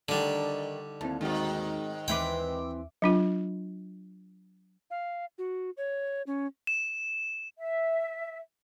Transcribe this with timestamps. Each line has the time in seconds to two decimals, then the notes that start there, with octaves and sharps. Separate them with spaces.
0.09 D3 D#3 G3 D4
1.01 D#2 C4 E4 A5
1.21 G#2 D#3 G#3 C4 F#4
2.08 D#2 E3 C4 B4 E5 G5 D6
3.02 F#3 D4 F4
4.91 F5
5.38 F#4
5.77 C#5
6.27 C#4
6.67 E7
7.58 E5